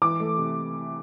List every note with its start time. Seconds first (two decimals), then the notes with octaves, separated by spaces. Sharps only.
0.02 E3 D6
0.20 A3
0.38 C3